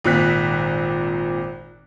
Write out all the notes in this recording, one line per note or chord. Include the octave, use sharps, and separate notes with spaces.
G#1 A#2 C4 F#6 B6